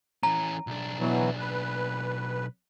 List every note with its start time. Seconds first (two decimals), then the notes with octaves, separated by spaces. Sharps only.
0.23 E3 C#4 A#5
0.67 B1 D4
0.99 B2 E3 F#3
1.39 B4